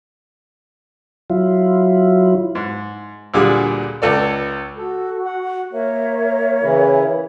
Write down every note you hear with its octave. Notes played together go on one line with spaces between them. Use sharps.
F#3 E4 F4
G#2
D2 A#2 D3 G3 G#4
C#2 A4 D5
F#4 A4
F#5
A#3 A#4 C#5 E5
C#3 E3 E4